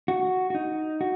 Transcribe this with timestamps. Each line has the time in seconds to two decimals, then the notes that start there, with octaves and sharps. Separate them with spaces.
0.08 F#4
0.50 F#4
0.55 D#4
1.01 F#4